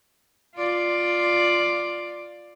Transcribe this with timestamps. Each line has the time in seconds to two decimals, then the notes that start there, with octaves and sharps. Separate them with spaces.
0.56 F4 D5